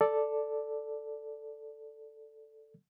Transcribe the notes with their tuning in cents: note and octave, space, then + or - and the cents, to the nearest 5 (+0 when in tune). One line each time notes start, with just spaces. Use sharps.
A4 +0 D5 +0